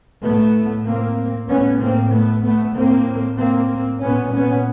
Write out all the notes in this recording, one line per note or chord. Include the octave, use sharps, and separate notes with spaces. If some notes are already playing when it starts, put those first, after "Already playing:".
A2 A3 B3
A#3 C4
A2 B3 C#4
A#3 C4
A3 B3
A3 B3
A2 A#3 C4
A#3 C4
A#2 B3 C#4
B3 C#4